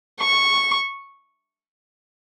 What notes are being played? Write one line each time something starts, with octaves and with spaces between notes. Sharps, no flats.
C#6